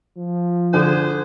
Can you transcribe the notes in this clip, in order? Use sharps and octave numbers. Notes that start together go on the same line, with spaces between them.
F3
D3 G#4 B4 C5